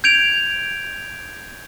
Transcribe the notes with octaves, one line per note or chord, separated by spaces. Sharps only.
G6 G#6 D7 F7